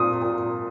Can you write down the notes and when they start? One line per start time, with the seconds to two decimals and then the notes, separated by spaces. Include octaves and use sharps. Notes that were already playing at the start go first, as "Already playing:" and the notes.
Already playing: A#2 C4 D#6
0.22 A#2